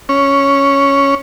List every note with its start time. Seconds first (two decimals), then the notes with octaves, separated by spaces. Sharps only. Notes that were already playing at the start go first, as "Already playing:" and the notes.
0.09 C#4